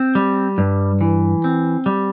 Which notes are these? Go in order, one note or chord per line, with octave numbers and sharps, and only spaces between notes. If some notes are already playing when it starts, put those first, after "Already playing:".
Already playing: C4
G3
G2
E3
C4
G3